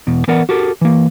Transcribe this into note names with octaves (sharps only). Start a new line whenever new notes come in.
E2 B2
E3 B3 A#4 D5 F#5
F#4 G4 A4 A#4
E3 A#3